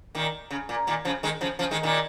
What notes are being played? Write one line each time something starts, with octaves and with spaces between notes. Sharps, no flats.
A#2 D#3
C#3
A#2
A#2 D#3
C#3 F3
D#3 G#3
C#3 F3
C#3 F3
D#3 G#3
A#2 D#3